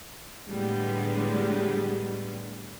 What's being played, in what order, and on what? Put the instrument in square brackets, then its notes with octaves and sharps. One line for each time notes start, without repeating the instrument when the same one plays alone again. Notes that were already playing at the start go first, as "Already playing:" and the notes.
[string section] A2 D3 G3 G#3 B3